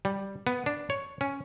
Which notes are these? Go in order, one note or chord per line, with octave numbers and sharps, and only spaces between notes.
G3
B3
D4
C#5
C#4